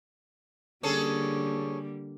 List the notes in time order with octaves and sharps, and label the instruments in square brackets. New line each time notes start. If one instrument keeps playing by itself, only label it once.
[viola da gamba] D3 G3 A#3 [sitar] C#4 G#4 A4